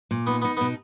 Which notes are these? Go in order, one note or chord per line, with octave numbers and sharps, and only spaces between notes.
A#2
B3 D#4
B3
D#4
B3
B2